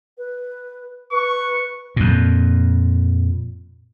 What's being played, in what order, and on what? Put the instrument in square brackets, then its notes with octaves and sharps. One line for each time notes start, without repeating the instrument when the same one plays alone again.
[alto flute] B4
[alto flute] B4 [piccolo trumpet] C#6
[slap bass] F2 A#2